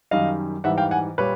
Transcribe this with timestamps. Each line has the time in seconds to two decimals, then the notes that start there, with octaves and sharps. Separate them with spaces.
0.11 F#2 D#3 G3 D#5 F5
0.64 G#2 E3 G3 E5 F#5
0.78 F5 G5
0.91 F#5 G#5
1.18 A#2 G3 B4 C#5